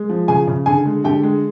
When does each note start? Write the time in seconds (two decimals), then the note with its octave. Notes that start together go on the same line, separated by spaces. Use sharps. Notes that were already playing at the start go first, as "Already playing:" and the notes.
Already playing: G#3
0.09 F3
0.28 C#3 G#4 G#5
0.47 C#3
0.66 D3 G#4 G#5
0.85 G#3
1.04 D3 G4 G5
1.23 G#3